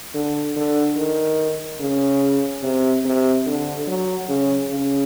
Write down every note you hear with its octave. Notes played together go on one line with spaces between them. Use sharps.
D3
D3
D#3
C#3
C3
C3
D3
F#3
C#3
C#3